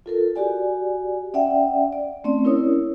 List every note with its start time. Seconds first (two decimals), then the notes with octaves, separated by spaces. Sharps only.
0.06 F4 A4 A#4
0.36 F#4 G4 D5 G#5
1.34 C#4 D5 E5 F#5 G5
1.93 D5
2.24 A3 C4 C#4 D5
2.44 C#4 E4 A#4 C#5 D#6